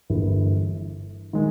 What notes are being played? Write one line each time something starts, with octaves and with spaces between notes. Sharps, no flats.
G1 G2 E3 A#3
D#3 G#3